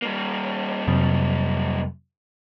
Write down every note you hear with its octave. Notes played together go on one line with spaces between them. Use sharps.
G3 A#3
F2 C3 F#3